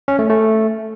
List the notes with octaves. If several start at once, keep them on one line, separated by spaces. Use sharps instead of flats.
C#4
A3
A3